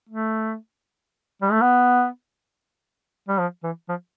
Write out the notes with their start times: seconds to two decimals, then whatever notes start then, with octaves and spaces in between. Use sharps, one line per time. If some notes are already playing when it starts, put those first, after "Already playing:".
0.09 A3
1.42 G3
1.52 A3
1.61 B3
3.29 G3
3.39 F3
3.63 E3
3.89 F3